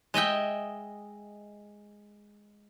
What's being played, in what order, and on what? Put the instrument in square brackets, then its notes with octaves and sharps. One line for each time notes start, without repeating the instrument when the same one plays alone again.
[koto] G#3 D#5 E5 G5